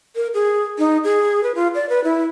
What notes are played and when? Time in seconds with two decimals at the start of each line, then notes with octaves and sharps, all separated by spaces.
0.16 A#4
0.34 G#4
0.78 D#4
1.04 G#4
1.43 B4
1.55 F4
1.75 D5
1.89 B4
2.04 E4